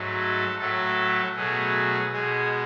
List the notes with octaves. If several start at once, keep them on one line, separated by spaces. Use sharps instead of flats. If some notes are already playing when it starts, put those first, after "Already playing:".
Already playing: G#2 F#3 A3
A4
A2 F#3 A3 A4
B2 F#3 A3 G#4
B2 G#3 G#4